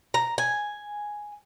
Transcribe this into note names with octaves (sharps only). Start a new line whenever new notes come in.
A#5
G#5